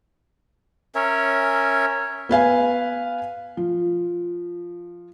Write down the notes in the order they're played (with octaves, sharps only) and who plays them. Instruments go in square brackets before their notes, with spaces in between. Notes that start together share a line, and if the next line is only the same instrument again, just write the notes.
[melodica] C#4 A#4 C#5 E5
[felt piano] B3 B4 F5 G#5
F3